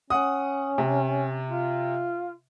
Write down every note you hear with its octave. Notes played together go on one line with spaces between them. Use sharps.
C#4 F#5 D#6
C3
F4